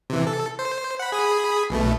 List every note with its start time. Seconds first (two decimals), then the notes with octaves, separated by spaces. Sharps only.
0.10 C3 E3
0.27 A4
0.59 C5
0.99 F#5 B5
1.12 G#4 B5 D#6
1.70 B1 B2 A3